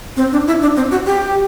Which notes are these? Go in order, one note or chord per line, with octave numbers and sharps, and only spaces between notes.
C4
D4
E4
D4
C4
F#4
G4